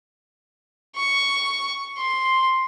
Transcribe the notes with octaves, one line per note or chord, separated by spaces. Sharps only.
C#6
C6